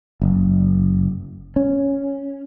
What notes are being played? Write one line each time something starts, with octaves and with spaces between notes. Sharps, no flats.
F#1
C#4